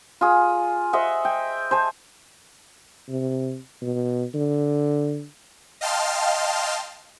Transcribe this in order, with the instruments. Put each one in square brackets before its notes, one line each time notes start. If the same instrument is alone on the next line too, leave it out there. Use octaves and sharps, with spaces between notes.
[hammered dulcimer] F4 G#4
C5 D#5 E5 F#5
G5
C5 G#5 A5
[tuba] C3
B2
D3
[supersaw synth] D#5 F5 G5 A5 C6 F6